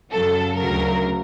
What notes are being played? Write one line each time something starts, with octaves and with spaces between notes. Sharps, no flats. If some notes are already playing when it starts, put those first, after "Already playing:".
F#2 C#3 F#3 A4
D2 C#3 F#3 A#4